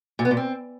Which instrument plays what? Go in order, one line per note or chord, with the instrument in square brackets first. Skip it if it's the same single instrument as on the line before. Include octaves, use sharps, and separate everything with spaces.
[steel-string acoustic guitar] A#2
B3
A#2
C4